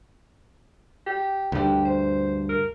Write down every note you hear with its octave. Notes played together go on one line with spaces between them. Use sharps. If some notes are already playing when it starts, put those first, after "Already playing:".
G4
D2 G2 G4
C5
A#4